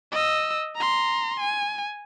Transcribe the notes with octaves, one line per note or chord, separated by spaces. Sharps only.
D#5 E6
A#5 C6
G#5